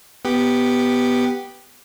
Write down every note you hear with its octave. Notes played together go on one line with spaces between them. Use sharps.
B3 G4